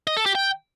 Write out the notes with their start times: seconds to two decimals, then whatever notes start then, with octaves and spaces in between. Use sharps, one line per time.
0.07 D#5
0.17 A4
0.26 G4
0.35 G5